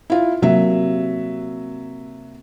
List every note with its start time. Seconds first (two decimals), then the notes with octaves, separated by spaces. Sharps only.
0.10 E4 F4
0.42 C3 F#3 A#3 E5